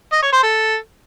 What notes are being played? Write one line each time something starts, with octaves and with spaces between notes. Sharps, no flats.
D#5
C#5
C5
A4